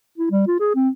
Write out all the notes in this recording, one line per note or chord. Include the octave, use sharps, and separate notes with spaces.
E4
G3
F4
G#4
C4